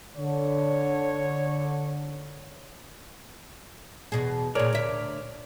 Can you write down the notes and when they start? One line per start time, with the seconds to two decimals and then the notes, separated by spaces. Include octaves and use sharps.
0.17 D3 C#5
4.12 E2 B2 G#4
4.55 A#2 G#4 A#4 C#5 D5
4.73 D2 E5